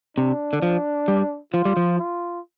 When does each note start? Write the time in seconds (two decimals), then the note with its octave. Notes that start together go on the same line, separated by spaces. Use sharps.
0.17 C3 D4
0.53 D3
0.62 F3
1.08 G3
1.53 F3 F4
1.65 G3
1.77 F3
1.99 F4